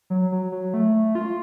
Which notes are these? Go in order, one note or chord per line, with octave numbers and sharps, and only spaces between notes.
F#3
F#3
F#3
A3
F4